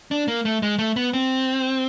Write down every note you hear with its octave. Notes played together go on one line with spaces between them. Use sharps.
D4
A#3
A3
G#3
A3
B3
C4